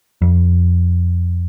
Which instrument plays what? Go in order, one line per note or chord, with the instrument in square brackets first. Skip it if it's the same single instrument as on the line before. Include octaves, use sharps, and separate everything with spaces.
[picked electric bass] F2